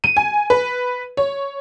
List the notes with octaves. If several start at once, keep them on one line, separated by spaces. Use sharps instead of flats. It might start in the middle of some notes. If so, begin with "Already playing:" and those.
D#7
G#5
B4
C#5